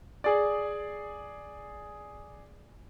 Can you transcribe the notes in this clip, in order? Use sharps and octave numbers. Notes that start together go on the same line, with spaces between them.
G#4 D5